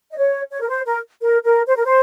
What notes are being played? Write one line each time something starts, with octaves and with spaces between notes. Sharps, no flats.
D#5
C#5
C#5
A#4
C5
A#4
A#4
A#4
C5
A#4
C5